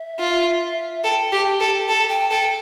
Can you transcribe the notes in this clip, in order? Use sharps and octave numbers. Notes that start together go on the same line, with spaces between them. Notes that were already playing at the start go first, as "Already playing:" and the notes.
Already playing: E5
F4
A4 G5
G4
A4
A4 A5
G5
A4 G5